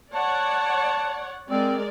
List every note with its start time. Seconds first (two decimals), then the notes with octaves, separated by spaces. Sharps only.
0.14 C#5 D5 F#5 A5
1.50 G#3 C4 A#4 D5